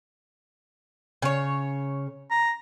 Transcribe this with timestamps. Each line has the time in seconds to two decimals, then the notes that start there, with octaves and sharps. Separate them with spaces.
1.22 C#3 C#5
2.31 A#5